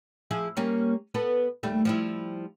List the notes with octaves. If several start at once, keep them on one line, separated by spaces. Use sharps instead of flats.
F3 E4 G#4
G3 A#3 C#4
B3 A4 B4
D#2 G3 A3
F3 G3 E4